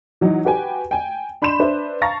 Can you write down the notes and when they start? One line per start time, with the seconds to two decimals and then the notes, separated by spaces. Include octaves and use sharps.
0.21 E3 F#3 D#4
0.45 F#4 G4 B4 G5 G#5
0.91 G5 G#5
1.42 D4 B5 C6 G6 E7
1.59 D4 B4 C5 E5
2.01 F5 A5 A#5 C#6 A6 A#6